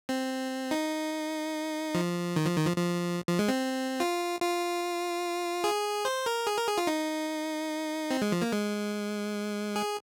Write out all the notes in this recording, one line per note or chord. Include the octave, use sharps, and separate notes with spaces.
C4
D#4
F3
D#3
F3
D#3
F3
F3
F3
G#3
C4
F4
F4
G#4
C5
A#4
G#4
A#4
G#4
F4
D#4
C4
G#3
F3
A#3
G#3
G#4